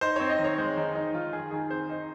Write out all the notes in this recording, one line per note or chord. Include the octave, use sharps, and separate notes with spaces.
D#4 C5
C4 C#5
D#5
D#3
C#5
G#3 C5
D#3 D#4
D#4
D#3 F4
D#3 G#4
D#3 G#4
C4 C5
D#4